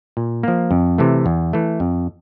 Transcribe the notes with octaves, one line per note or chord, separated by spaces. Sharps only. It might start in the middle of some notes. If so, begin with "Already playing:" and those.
A#2
F3 A#3
F2
C3 E3 A3
E2
E3 A3
F2